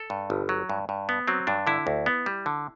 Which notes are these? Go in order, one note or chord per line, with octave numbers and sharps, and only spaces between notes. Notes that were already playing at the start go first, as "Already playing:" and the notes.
Already playing: A4
G2
G1
F#3
G2
G2
B3
F#3 C4
G2 D4
D3 E4
D2
B3
G3
D3